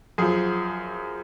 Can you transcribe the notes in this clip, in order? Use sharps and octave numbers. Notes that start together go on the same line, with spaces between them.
F#2 F3 G#4